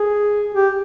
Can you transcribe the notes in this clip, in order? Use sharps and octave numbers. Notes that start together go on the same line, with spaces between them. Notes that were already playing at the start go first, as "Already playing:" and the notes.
Already playing: G#4
G4